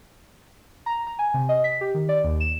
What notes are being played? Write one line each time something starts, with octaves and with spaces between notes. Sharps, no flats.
A#5
A#5
G#5
C3
D#5
B6
G4
D#3
D5
D#2
E7